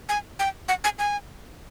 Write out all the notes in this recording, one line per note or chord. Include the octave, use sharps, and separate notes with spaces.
G#5
G5
F#5
G#5
G#5